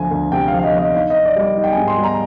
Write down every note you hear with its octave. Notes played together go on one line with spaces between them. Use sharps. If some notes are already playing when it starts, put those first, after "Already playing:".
Already playing: D2 F3 G#5
D2
C3 G5
F5
F3
F5
D#5
F3 D#5
D#4 F5
D#5
D#4
D5
G3 D5
D#4
G5
G#5
G#2
C6
G3
A#5